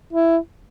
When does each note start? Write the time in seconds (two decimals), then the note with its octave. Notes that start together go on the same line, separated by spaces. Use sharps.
0.13 E4